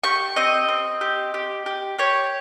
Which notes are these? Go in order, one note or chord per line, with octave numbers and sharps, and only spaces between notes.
G4 C#6
C4 D#5
C4
G4
G4
G4
G4 C#5